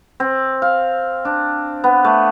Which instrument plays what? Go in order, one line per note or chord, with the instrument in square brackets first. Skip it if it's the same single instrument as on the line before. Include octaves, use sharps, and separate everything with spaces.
[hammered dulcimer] C4
F5
D4
B3
A3